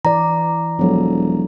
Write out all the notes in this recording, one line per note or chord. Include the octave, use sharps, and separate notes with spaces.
E3 D5 A#5
E1 F3 F#3 A4